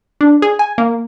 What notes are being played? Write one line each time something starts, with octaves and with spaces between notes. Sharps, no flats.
D4
G#4
G#5
A#3